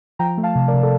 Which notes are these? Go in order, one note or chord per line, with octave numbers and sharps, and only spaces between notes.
F3 G5 A#5
A3
F5 A5
C3
A#4 D5
C3
A4